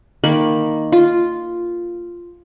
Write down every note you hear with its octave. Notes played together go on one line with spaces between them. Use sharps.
D#3 A#3 B5
F4